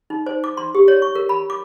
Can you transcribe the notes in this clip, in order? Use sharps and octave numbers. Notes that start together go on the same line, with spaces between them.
D#4
C5
D6
C6
G4
C#5
C#6
A#4
B5
D6